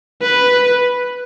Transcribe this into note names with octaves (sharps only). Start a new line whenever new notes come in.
B4